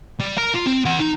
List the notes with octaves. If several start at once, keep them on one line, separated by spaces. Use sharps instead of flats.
G3
A#4 A#5
F4
C4
E3 F#5
D#4